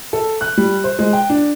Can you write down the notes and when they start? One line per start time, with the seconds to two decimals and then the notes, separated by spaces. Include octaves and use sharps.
0.13 A4
0.41 F#6
0.58 G3
0.84 C5
0.99 G#3
1.13 G5
1.30 D4